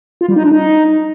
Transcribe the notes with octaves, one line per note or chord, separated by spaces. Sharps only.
F4
G3
D#4
D4
D#4